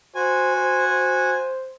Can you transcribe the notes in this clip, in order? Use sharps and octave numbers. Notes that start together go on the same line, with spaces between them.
F#4 C5 G#5
C5
C5